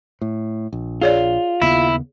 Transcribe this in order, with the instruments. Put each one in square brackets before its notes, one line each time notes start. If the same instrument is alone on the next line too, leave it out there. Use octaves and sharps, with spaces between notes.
[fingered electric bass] A2
A#1
[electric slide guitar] F4 [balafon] G#4 C#5 D5
[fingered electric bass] D#2 C#3 B3 [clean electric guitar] E4